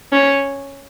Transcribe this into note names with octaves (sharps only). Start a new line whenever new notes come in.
C#4